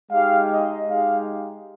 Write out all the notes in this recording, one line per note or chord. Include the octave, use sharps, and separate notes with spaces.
G#3 D#4 G4 F5
D#5
G#3 D#4 G4 F5